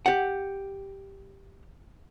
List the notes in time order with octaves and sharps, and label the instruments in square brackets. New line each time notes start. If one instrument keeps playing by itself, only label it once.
[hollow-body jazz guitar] G4 F#5